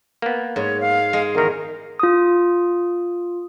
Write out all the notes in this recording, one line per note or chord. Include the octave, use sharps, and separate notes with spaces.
A#3 B3
G#2 C#5
F5
G#3
E2 D#3 A#4
F4 D#6